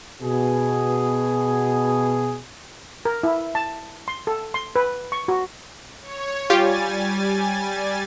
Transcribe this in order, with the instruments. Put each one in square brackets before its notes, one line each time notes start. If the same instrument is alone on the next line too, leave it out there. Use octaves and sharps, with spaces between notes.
[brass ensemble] B2 G#4
[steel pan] A#4
E4
A5
C6
A4
C6
B4
C#6
F#4
[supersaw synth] C#5
[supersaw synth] G3 G#5 A6 [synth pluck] F4 G4